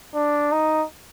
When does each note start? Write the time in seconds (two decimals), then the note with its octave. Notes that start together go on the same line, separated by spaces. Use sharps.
0.14 D4
0.52 D#4